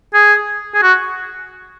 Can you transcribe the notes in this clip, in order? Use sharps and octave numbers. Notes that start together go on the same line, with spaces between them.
G#4
G#4
F#4